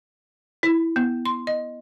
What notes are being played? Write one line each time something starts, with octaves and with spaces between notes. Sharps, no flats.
E4
B3
C6
D#5